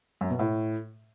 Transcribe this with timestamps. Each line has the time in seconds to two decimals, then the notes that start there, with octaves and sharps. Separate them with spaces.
0.21 F#2
0.30 B2
0.39 A2